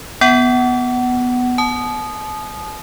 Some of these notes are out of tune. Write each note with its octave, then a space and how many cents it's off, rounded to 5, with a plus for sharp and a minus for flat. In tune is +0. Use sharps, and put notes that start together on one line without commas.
B3 +0 F#5 +25
A5 -40 D#6 -15